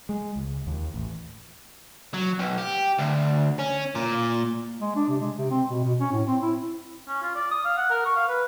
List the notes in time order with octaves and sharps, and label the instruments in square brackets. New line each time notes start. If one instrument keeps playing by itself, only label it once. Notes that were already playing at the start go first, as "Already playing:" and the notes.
[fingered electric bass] G#3
C#2
D#2
A1
[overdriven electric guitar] F#3
B1
G4
D2
C#4
A#2
[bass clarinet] G#3
D4
C3
G#3
C3
C4
B2
B2
C#4
A2
C4
E4
[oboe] C#4
F4
D5
D#6
F5
F#5
A#4
C#6
F5
B4